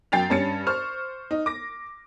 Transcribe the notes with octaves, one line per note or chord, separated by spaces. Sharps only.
F#2 G5 A6 C7 F7
G2 C#4 A6 C#7
C5 C#6 F6
D#4
D6 A#6